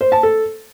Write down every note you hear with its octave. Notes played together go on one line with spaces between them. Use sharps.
C5
A5
A4